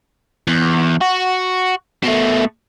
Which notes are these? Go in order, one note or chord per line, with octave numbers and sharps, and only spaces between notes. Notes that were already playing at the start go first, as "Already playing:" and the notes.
E2
F#4
B2 A3